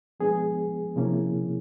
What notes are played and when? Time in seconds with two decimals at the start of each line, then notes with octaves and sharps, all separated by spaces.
0.20 F3 G#3 B3 D4 G#4
0.96 C3 F3 A#3 C#4 E4